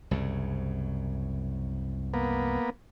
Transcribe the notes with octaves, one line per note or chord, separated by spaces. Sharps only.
C2 F#2 C#3
A#3 B3